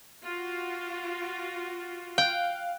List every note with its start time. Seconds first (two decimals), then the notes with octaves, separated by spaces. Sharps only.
0.24 F4 F#4
2.18 F5 G5 F#6